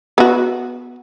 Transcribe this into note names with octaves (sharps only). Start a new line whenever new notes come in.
B3 F#4